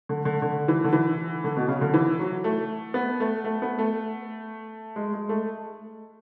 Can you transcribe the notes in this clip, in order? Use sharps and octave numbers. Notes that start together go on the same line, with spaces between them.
D3
D3
D3
E3
D3
E3
D3
B2
C#3
D3
E3
F#3
A3
B3
A3
A3
B3
A3
G#3
G#3
A3